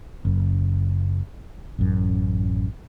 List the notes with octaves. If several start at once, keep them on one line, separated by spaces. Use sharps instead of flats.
F#1 F#2
A1 F#2